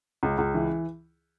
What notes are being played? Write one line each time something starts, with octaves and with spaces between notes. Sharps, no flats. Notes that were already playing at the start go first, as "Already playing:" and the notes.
C#2
C#2
E3